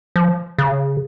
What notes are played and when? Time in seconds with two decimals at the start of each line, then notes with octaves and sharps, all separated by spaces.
0.16 F3
0.58 C#3